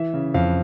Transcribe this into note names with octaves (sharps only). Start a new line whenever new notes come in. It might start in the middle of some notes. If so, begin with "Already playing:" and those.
Already playing: E3 E5
C#3
F2 F5